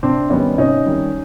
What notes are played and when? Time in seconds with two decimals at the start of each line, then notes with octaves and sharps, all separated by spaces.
0.03 C3 C4 D4
0.30 D#3 G3 B3 C#4
0.58 C3 C#4 D#4
0.86 D#3 G3